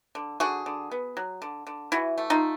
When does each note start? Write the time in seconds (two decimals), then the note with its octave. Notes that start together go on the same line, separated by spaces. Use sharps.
0.15 D3
0.40 D3 F#4 G#4
0.66 D3
0.91 B3
1.17 F#3
1.42 D3
1.67 D3
1.92 E3 E4 F#4
2.18 A3
2.30 D#4 F4